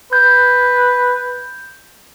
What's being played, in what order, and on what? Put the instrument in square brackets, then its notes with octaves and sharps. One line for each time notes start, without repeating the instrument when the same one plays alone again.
[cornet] B4 [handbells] G6